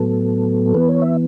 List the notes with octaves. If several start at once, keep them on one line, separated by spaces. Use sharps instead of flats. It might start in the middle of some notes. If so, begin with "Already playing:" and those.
Already playing: A2 F#3 B3 A4
E3 B3 B4
C#5
E5